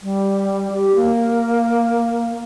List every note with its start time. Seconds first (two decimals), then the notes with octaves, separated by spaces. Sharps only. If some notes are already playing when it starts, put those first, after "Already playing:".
0.03 G3
0.72 G4
0.95 A#3